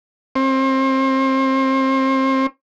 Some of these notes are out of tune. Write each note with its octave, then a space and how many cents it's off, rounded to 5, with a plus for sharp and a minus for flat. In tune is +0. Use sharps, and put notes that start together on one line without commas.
C4 +30